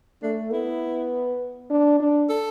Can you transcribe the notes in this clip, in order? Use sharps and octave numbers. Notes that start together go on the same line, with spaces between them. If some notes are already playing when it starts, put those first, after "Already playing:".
A3 D4
B3 E4
D4
D4
A4